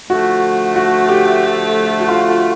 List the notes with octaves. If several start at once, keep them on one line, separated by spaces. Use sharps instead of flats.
D3 F3 A3 F#4
F#4
G4
F#4
F4